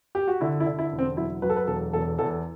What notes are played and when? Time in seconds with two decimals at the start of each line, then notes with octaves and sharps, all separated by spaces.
0.15 G4
0.28 F#4
0.41 D3 E4
0.60 E4
0.66 D3
0.79 E4
0.92 E1
0.99 C4
1.17 F#3 E4
1.42 F#3 B4
1.50 A4
1.56 B4
1.67 E1 A4
1.93 E2 A4
2.18 E2 A4